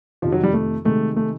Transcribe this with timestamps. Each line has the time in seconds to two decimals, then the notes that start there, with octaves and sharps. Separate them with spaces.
0.22 F2 C3 D#3 F3
0.32 F#3
0.43 G3
0.54 A3
0.85 C3 D#3 G#3 A3
1.16 A3